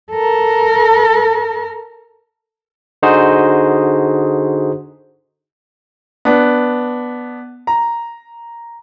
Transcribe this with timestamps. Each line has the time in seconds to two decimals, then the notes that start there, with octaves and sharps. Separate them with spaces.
0.12 A4 A#4
3.03 D3 D#4 F#4 G#4 C5
6.25 B3 D4
7.67 A#5